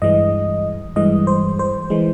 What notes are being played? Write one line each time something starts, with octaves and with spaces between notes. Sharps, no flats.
G2 E3 G#3 D#5
G2 E3 G#3 D#5
C5
C5
E3 G#3